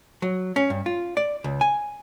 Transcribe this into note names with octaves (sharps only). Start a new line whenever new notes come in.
F#3
C#4
G2
F4
D5
C#2
G#5